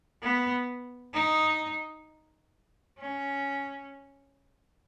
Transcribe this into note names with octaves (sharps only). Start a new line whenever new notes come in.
B3
D#4
C#4